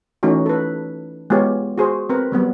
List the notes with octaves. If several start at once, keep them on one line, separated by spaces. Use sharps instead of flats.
E3 A3 C#4 D#4 F#4
A4 B4
G#3 B3 F4 G4 C#5
F#4 G#4 C5
C4 A#4 B4
F#3 G3 B3